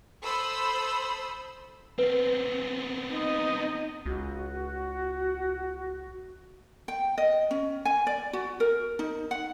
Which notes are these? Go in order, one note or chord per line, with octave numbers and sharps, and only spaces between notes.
A4 C5 B5 D#6 E6
B3 C4 B4
D#4 D#5
C#2 F#4
G5
D#5
C#4
G#5
D5
F#4
A#4
D#4
F#5